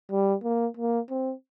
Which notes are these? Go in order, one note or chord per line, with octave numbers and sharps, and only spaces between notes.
G3
A#3
A#3
C4